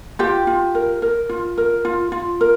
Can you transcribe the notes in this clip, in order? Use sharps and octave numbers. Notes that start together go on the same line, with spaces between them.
F4 G4 G5
F4
A#4
A#4
F4
A#4
F4
F4
A#4